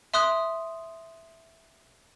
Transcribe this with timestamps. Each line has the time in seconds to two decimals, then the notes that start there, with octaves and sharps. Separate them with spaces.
0.14 E5 C6 D#6 F#6